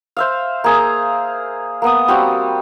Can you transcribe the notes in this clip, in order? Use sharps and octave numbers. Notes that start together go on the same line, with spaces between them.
C5 E5 F5
A#3 G#4 A#5
A#3 B3 D#6
G3 C4 F#4